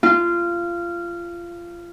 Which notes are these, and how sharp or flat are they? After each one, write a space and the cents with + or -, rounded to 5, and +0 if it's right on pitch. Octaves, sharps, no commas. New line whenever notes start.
F4 -20